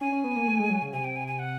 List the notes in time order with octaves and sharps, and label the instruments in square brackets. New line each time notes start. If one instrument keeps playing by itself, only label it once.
[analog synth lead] C#4 [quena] G#5
[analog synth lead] C#4
B3
A#3
A3
G#3
F#3
C#3
[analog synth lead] C3 [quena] G#5
[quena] G5
G#5
G#5
F#5